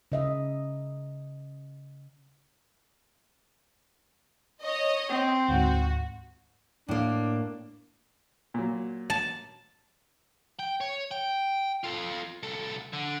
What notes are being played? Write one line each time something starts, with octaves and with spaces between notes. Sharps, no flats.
C#3 D#5 E5
C#5 D#5
C4
D2 G#2 F#4
A2 A#3 D4
A#2 F#3
A5
G5
C#5
G5
F4 A4
C2 A4
D3